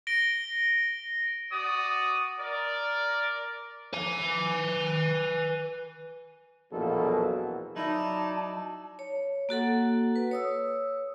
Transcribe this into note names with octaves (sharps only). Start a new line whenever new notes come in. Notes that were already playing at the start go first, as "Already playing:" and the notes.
A#6 D7 G7
F#4 D5 D#6
A#4 D5
B4 G#5
A#1 E2 B2 F#3 A#3 A4
F#3 D#4 E4 D5 A5
C#5
A#3 F#4 A4 F#5
B4
C#5 D#6 E6